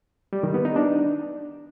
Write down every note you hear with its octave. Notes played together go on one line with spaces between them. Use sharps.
G3
D#3
B3
D#4
D4